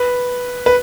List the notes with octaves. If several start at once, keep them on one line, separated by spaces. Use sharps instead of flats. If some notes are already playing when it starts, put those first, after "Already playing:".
Already playing: B4
B4